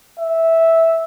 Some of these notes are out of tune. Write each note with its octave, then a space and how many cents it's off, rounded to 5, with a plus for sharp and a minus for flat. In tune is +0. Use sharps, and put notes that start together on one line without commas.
E5 -10